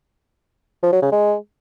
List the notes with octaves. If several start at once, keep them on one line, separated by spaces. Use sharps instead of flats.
F3
F#3
C#3
G#3